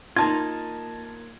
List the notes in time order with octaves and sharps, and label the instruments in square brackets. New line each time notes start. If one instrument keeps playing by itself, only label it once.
[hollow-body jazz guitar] A#3 D#4 F4 [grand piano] A5 G#6